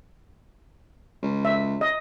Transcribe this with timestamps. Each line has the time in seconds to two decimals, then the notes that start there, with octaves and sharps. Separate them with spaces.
1.23 C#2
1.45 E5
1.81 D#5